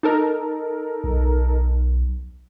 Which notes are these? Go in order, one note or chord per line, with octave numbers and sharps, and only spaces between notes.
D#4 A4 A#4
B1